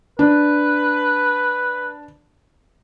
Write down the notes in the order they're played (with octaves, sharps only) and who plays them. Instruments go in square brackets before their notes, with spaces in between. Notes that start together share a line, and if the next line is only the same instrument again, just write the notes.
[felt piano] D4 [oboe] B4